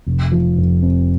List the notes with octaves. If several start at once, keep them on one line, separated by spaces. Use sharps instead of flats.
F1
F3
F2
C4